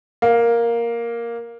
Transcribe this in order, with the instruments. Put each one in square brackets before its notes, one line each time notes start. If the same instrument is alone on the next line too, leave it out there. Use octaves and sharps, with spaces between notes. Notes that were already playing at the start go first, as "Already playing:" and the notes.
[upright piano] A#3